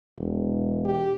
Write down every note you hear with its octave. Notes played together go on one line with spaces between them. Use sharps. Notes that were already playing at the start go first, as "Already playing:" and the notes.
E1
G4